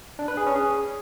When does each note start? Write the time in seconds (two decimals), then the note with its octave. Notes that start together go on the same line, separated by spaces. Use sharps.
0.19 D4
0.28 B4
0.37 G#4
0.46 C#4
0.56 G#4